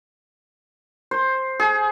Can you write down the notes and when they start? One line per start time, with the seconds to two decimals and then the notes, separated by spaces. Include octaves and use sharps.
1.11 C5
1.60 G#4